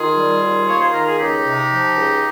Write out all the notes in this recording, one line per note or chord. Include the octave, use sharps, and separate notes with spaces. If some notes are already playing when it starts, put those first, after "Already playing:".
Already playing: D#3 F4 G#4
G3
D#2
A#3 C#5
C5
D#3 A#4
G#4
C#2 D#4 G4
C3
F3
C#2